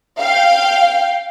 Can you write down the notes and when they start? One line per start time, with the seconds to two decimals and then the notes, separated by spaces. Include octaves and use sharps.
0.20 F5 G5